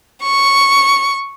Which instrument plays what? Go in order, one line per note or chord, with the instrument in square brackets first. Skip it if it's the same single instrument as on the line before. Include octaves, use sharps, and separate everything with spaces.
[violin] C#6